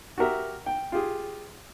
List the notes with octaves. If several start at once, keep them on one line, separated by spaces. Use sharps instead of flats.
F#4 G4 A#4 E5
G5
F4 G4 G#4